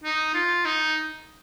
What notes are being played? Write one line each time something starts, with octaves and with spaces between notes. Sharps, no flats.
D#4
F4
D#4